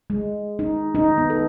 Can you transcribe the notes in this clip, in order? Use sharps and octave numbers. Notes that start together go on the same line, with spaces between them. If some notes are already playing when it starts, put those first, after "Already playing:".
G#3
D#4
D#4
B3
A4